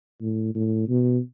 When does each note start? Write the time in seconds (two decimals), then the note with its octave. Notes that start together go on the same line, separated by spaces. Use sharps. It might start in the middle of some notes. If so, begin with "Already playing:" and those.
0.21 A2
0.55 A2
0.88 B2